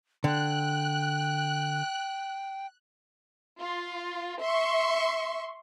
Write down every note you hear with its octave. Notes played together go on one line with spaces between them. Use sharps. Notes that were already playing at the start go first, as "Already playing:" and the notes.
D3 G5 F#6
F4
E5 C6 C#6